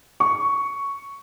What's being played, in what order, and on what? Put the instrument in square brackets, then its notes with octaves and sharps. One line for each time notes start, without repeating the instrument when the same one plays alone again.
[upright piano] C#6